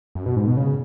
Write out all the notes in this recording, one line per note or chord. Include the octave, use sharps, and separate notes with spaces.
F#2
B2
G#2
B2
C#3